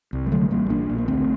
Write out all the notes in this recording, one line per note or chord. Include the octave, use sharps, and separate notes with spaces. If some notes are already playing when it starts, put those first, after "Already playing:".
C2
G3
D3 F#3 A3
A1 G3 A#3
A#1 A#3 D4
A#1
A#3
D2 A3 C4